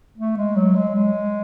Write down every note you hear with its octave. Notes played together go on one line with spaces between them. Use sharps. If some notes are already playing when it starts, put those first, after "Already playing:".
A3
G#3
F#3
G#3
G#3